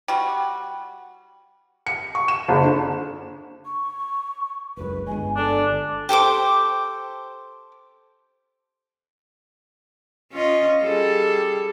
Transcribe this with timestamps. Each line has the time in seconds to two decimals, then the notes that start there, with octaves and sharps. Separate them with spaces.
0.08 G3 F#4 G5
1.86 C#7
2.15 C#6
2.28 E7
2.48 F#1
2.64 D3
3.65 C#6
4.77 F#1 C#2 F#2 B4
5.07 G1 G#3 G#5
5.36 D4 A4
6.09 G4 A4 C5 D6
10.32 C#4 F4 D#5
10.82 G3 G#4 A4